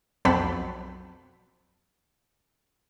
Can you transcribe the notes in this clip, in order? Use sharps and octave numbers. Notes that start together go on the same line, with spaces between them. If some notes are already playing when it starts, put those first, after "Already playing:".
B1 F2 C4 F#4 A5 B5